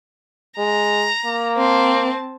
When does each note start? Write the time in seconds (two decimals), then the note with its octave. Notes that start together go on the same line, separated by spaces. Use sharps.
0.58 G#3 A#5
1.26 A#3
1.57 C4 A5